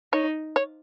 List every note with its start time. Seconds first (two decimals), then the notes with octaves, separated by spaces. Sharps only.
0.13 D#4 C#5
0.56 C#5